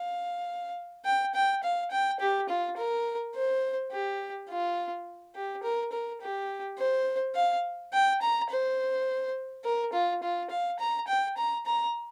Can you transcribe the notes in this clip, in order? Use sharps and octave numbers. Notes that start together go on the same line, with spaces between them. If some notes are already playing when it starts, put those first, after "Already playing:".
Already playing: F5
G5
G5
F5
G5
G4
F4
A#4
C5
G4
F4
G4
A#4
A#4
G4
C5
F5
G5
A#5
C5
A#4
F4
F4
F5
A#5
G5
A#5
A#5